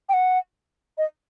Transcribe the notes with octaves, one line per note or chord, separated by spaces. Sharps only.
G5
F#5
D#5